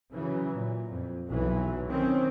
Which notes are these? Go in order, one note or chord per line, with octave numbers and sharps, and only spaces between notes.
C#3 E3 F#3
A#2
F2
B1 E3 F#3
D#3 C4 C#4